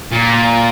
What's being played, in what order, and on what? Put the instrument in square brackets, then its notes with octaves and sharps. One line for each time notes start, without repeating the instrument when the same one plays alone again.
[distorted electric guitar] A#2